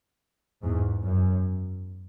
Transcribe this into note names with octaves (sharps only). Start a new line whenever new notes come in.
E2 G#2
F#2